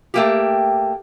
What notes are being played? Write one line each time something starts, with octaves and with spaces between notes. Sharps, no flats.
A3 A#3 G4